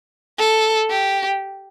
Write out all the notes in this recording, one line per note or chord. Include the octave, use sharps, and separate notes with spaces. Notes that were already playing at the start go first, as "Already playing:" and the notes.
A4
G4